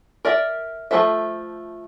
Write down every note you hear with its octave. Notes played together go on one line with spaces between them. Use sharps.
A#4 D5 E5
F3 A3 A4 C5 E5